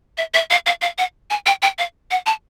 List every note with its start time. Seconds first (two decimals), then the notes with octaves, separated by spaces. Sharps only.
0.17 E5
0.34 E5
0.50 F5
0.66 F5
0.82 F5
0.98 F#5
1.30 G#5
1.46 G5
1.62 G5
1.78 F5
2.11 F#5
2.26 A5